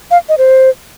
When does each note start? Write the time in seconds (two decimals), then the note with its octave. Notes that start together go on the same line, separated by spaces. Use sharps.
0.11 F5
0.29 D#5
0.38 C5